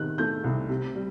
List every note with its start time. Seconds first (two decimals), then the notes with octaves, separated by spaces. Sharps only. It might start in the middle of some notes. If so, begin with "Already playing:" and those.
Already playing: C3 D#3 F#6
0.18 A3 G6
0.44 C2
0.69 C3
0.95 G3